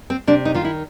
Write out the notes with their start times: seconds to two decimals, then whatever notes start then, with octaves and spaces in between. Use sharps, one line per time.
0.10 C4
0.27 C3 D4
0.45 D#4
0.55 D#3 F4
0.65 E4